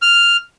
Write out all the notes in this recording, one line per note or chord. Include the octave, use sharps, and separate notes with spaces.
F6